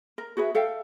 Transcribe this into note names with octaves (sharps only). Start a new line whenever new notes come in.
A#4
F#4 G#4 B4 E5
A4 E5 F5 G5